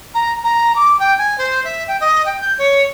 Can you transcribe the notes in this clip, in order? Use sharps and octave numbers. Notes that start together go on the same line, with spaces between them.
A#5
A#5
D6
G5
G#5
C5
E5
G5
D#5
G5
G6
C#5